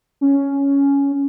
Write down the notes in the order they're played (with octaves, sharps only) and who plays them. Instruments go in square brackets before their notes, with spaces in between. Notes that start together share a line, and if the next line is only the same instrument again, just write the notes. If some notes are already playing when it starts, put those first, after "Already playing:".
[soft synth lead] C#4